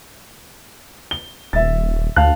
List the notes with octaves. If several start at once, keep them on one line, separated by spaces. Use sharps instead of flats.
G7
D#1 E5 A6
D2 F5 A5 F#6